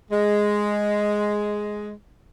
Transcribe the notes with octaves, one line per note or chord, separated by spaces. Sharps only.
G#3